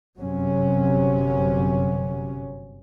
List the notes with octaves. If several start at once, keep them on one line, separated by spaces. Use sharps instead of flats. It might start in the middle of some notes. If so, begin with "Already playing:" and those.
G1 F#2 C3 F#3 C#4